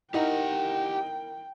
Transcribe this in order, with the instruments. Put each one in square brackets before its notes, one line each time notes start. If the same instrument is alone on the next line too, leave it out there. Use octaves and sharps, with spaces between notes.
[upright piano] D#4 [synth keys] E4 A#4 [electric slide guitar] G4 F#5 [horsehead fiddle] G5